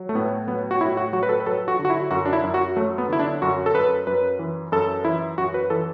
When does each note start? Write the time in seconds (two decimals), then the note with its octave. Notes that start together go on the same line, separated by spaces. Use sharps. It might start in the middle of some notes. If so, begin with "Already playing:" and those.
Already playing: F#3
0.09 A3
0.15 A2 B3
0.47 F#3 B3
0.71 F#4
0.81 A2 E4
0.97 F#4
1.13 F#3 F#4
1.23 B4
1.29 A4
1.40 B4
1.46 F#3 A4
1.68 F#4
1.79 D3
1.85 F#4
1.90 E4
2.11 F#2 F#4
2.25 D4
2.33 E4
2.43 F#2
2.54 F#4
2.76 F#3 A3
2.98 B3
3.09 D3 E4
3.19 D4
3.42 F#2 F#4
3.66 A4
3.74 F#2 B4
4.07 F#2 B4
4.39 E3
4.72 F#2 A4
5.05 E3 E4
5.38 F#2 F#4
5.54 B4
5.70 E3 A4